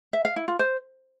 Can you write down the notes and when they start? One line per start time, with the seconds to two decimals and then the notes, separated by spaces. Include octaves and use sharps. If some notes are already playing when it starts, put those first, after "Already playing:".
0.13 E5
0.25 F5
0.36 E4
0.48 F4
0.59 C5